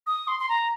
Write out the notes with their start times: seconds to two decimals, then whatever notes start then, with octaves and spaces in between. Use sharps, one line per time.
0.07 D#6
0.28 C6
0.40 C6
0.49 A#5